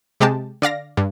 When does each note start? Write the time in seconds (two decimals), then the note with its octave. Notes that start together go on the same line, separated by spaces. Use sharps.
0.20 C3 G#3 G4 A5
0.62 D3 D5 F5 A#6
0.97 G2